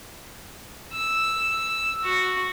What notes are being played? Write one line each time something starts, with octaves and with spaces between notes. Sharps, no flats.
E6
F#4